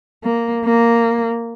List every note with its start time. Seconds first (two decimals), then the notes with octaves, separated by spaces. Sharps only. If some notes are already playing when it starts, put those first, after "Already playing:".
0.24 A#3
0.65 A#3